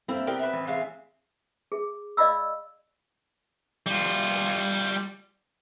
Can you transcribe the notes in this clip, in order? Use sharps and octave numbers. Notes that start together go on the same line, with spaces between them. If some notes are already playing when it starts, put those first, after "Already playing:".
A3 A#3 C4 E4
B3 G4 A#4 D5 G5
B4 E5
A1
G#3 E5 F5
G#4
D5 D#5 F5 B5 E6
G3 F4